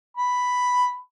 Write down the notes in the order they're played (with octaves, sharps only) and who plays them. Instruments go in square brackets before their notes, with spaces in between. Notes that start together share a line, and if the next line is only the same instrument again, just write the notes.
[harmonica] B5